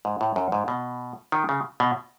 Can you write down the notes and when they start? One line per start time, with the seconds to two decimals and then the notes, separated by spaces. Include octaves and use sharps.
0.05 G#2
0.21 A2
0.36 F#2
0.52 G#2
0.68 B2
1.32 D#3
1.49 C#3
1.80 B2